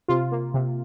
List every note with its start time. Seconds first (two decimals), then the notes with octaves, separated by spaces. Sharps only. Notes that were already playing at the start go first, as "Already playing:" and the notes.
0.08 C3 F4
0.32 A#3
0.54 C3